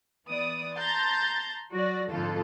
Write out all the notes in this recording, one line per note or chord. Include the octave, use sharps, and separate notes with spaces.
E3 B3 D5 D#6
A5 A#5 C6 G6 A6
F#3 F#4 D5 A#6
F2 G#2 D3 F4 A4